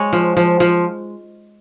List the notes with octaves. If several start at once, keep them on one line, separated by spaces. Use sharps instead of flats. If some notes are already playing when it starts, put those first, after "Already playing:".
Already playing: G#3 C#5
F3
F3
F3